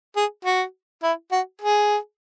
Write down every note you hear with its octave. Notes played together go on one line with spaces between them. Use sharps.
G#4
F#4
E4
F#4
G#4